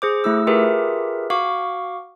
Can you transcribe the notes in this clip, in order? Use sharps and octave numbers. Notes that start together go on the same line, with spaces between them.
G#4 C5 D6
A3 E4 E6
F4 G4 G#4 A#4 B4 E5
F#4 F5 C#6 D6